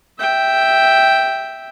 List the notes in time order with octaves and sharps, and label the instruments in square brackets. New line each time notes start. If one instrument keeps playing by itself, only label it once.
[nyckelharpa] E5 G5